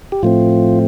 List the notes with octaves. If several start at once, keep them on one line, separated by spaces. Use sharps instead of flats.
G4
A2 F3 A3 C4 F4